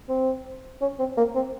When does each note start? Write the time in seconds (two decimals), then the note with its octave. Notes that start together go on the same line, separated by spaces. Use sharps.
0.09 C4
0.81 C#4
0.99 C4
1.17 A#3
1.35 C4